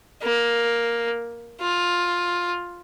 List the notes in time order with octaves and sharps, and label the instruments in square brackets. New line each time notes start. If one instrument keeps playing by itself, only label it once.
[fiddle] A#3
F4